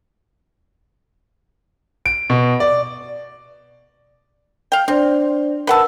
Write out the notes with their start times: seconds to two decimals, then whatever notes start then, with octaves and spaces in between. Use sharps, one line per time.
2.06 D7
2.30 B2
2.60 D5
4.72 F5 G5
4.88 C4 D4 C5 D5
5.67 A#4 B4 F#5 A5 E6